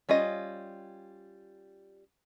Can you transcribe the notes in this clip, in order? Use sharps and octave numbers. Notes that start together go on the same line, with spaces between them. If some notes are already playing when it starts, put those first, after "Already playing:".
G3 C#4 F4 D#5